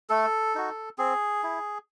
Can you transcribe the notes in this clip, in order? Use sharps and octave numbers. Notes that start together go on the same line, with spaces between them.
A3 A4
D#4 F#4
C4 G#4
E4